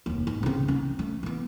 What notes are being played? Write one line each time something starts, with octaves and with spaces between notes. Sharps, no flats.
F1 D#2
G#2
C#3 C4
C#4
A3
E3 B3